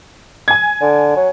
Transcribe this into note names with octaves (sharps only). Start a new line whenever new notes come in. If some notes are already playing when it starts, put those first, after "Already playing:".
G#5 G#6
D3
F#3